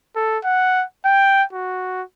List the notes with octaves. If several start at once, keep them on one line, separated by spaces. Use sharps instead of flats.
A4
F#5
G5
F#4